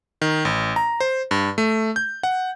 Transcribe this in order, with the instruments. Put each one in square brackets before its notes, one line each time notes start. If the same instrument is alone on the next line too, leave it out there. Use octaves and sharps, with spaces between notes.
[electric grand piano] D#3
A1
A#5
C5
G2
A3
G6
F#5